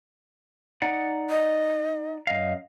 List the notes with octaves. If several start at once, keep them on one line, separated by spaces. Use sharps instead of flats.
D#4 D5 F#5
D#5
F#2 D#5 F5